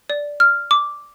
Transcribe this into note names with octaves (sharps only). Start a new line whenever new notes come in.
D5
F6
D6